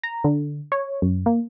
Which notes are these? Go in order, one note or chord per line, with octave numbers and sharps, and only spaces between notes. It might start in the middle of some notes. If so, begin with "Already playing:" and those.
A#5
D3
C#5
F#2
A#3